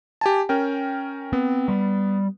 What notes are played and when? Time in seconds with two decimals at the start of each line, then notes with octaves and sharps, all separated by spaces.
0.21 G4 G#5 A5
0.49 C#4 A#4 G5
1.33 B3 C4
1.68 G3